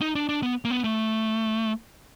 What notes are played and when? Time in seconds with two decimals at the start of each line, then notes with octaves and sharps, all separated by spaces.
0.01 D#4
0.15 D4
0.29 D4
0.43 B3
0.65 A#3
0.70 B3
0.84 A3